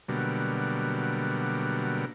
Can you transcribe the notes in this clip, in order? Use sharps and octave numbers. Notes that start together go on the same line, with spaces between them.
B2 D3 F#3 G3 A#3